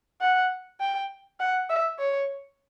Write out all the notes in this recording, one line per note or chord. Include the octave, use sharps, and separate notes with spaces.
F#5
G5
F#5
E5
C#5